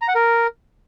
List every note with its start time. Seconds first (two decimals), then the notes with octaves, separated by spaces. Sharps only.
0.02 A#5
0.08 F#5
0.15 A#4